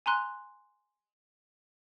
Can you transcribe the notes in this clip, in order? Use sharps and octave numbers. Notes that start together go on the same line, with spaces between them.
G#5 A#5 C6 F#6